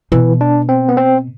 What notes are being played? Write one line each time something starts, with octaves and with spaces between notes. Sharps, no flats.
B2 E3
D4
C4
B3
C4